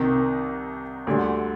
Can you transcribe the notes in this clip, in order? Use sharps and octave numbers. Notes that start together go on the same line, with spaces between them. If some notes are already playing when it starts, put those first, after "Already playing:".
Already playing: C2 C3 D#3
D2 D3 G3